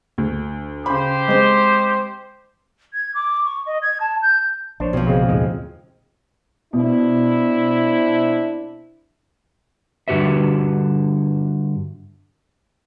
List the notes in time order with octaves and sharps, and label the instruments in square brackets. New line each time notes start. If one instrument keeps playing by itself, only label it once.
[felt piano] D2
[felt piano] C#3 B5 [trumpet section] G4 C5
[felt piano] G#3 C4
[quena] G#6
D6
C#6
D#5
G#6
A5
G6
[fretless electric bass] A#1 [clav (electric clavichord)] D4 C5 C#5
[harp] F2 F3 [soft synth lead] B2
[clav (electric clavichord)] C#3 G#3 C4
[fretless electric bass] D#2 A2 C#3 [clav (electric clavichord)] G#3
[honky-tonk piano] B2 [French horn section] C4 D4 E4
[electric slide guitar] G2 D3 F#4 G4 B4 E5